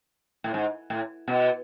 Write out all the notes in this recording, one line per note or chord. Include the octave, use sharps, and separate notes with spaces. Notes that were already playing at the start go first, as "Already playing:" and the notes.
A2
G#2
A2
B2